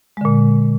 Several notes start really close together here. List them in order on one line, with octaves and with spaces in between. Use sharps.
G#3 D3 A#2